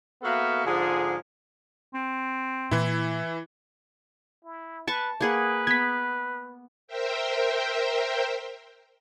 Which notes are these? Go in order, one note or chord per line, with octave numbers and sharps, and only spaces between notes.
A#3 B3 F#4 A4 E5 F5
G#2 D3 F3 F4 G#4
C4
A#2 E3 E4
E4
B4 A5 C#6
A#3 G#4 B4 F#5
B3 G#6 B6
A#4 C5 E5 G5